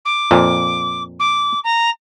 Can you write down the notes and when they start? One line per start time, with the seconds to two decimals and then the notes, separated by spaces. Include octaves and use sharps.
0.05 D6
0.31 F2 A#2
1.19 D6
1.64 A#5